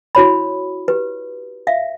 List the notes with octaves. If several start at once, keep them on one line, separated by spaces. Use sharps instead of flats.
E4 F#4 C#5 B5
G4 B4
E5 F5